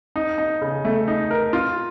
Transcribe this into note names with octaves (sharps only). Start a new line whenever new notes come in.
D#4
D#4
C#3
A3
D#4
A#4
F4